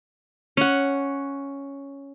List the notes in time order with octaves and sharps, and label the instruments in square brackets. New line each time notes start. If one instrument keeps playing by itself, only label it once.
[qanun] C#4 F#5